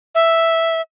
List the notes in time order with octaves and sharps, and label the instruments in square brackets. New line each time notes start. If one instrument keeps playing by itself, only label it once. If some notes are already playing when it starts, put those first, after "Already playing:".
[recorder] E5